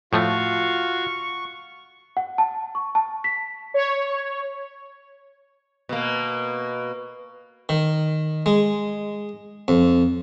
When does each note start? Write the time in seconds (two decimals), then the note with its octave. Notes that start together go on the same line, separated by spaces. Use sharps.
0.13 A2 F3 A3 F4 F#4 F5 C#6
2.17 F#5
2.38 A5
2.75 C#6
2.95 A5
3.24 B6
3.74 C#5
5.89 B2 A#3
7.69 D#3
8.46 G#3
9.68 F2